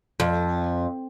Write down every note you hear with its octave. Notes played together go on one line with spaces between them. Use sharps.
F2